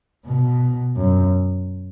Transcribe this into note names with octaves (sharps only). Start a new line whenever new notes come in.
B2
F#2